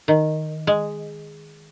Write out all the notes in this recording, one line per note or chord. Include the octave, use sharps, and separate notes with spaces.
D#3
G#3